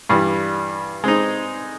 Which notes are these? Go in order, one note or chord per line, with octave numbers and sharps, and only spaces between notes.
G2 E3 G3
G#3 C4 D#4